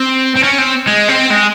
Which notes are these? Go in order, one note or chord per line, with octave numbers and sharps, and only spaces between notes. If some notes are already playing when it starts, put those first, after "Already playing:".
Already playing: C4
C4
C#4
C4
G#3
C4
G#3